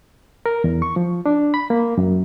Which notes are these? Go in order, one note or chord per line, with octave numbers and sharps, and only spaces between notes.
A#4
E2
C#6
F3
D4
B5
A#3
F#2